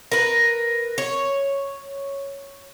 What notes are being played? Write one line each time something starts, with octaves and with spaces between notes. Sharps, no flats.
A#4 B4
C#5